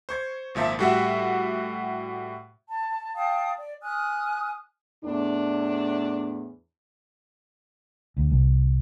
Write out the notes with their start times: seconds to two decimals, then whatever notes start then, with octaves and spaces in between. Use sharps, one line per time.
0.09 C5 C#6 G#6
0.55 G#1 A#2 F3 E5 A5
0.79 A2 G3 F#4 E5 F#5 E6
2.69 A5
3.15 F5 G5 A5 D#6
3.57 D5
3.81 G#5 D#6 F6 F#6
5.04 E2 A2 D4
8.17 D2
8.31 C2